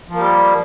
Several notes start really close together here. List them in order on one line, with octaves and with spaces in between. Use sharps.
F3 A#3 G3